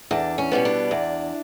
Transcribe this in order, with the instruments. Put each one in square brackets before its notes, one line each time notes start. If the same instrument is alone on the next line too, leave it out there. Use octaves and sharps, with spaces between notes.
[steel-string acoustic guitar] E2 D4
C#4
B2 G3 B3
D4
E2